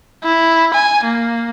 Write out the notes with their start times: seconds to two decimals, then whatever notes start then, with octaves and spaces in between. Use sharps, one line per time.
0.24 E4
0.73 G#5
1.04 A#3